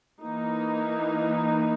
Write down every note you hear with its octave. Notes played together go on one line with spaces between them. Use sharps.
E3 A#3 D#4